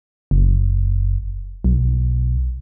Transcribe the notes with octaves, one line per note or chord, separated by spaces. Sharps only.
F#1
B1